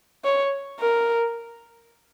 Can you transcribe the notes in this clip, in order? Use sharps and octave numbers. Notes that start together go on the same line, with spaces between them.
C#5
A#4